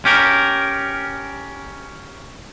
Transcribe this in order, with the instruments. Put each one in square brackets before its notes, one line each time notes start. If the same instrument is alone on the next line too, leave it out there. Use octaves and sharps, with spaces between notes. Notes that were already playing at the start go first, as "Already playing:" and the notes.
[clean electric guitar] C#4 G4 A#4